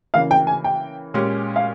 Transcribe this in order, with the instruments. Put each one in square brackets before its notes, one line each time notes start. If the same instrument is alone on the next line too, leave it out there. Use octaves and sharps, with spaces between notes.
[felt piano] C#3 E3 A#3 [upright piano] F5
[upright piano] G5
G#5
G5
[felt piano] A#2 G#3 C#4 G4
[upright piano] F5